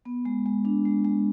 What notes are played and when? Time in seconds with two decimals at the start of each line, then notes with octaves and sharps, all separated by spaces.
0.05 B3
0.25 G#3
0.46 G#3
0.65 D4
0.85 G#3
1.05 G#3